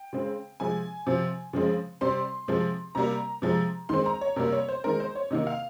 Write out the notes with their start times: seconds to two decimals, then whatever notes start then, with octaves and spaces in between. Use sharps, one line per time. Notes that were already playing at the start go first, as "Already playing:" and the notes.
Already playing: G5
0.13 C#3 G#3 C4
0.60 C3 F3 G#3 G#5
1.07 C3 F3 C4
1.53 C#3 F3 G#3 C4
2.01 C3 G3 C4 C6
2.48 C3 F3 G#3 C4
2.95 C3 G3 A#3 A#5
3.42 C3 F3 G#3
3.89 D#3 G#3 C4 C6
4.06 A#5
4.21 C#5
4.36 C3 G3 A#3 A#4
4.52 C#5
4.68 C5
4.84 D#3 G#3 C4 A#4
5.00 C5
5.15 C#5
5.31 C3 D#3 A#3 D#5
5.47 F5